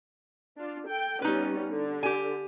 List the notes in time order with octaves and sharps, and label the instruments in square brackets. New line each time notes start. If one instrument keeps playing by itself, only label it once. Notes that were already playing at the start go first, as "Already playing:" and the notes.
[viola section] D4 F4
A4 G5
[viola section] G3 B3 C#4 [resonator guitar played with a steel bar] D#4 B4
[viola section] D3
[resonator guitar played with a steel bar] G4 G#5